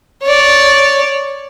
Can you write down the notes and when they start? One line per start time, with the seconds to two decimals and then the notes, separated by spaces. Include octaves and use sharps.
0.24 C#5 D5